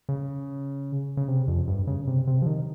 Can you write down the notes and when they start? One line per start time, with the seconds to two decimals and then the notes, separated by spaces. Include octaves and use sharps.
0.09 C#3
1.17 C#3
1.28 C3
1.48 F2
1.68 G2
1.87 C#3
2.07 C3
2.27 C3
2.42 F3
2.46 D#3